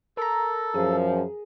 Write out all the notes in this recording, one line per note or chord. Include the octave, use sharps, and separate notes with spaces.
A4 A#4 A#5
F#2 F3 G#4